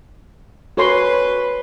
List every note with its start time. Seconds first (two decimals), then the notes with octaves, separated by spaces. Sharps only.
0.77 F#4 B4 C#5 C6